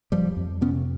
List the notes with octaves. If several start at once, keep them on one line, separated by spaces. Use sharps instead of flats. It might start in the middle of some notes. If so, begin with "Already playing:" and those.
F2 F3 G3
F2
C3 B3 C#4